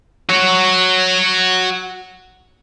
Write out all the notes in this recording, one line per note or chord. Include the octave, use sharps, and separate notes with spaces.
F#4 C#5